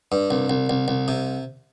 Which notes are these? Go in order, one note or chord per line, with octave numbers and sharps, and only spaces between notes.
G2
C2
C2
C2
C2
C3